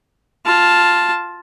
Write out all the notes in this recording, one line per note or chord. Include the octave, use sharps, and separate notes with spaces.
F4 A5